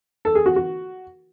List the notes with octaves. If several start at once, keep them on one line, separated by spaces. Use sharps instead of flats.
A4
G#4
F#4
F#4